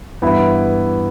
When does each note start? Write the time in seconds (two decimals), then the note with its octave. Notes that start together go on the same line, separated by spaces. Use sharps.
0.22 G2 E3 B3 E4